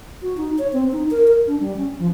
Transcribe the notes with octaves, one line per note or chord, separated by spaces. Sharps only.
F#4
D#4
C#5
C4
D#4
A#4
A#4
D4
G3
C#4
F3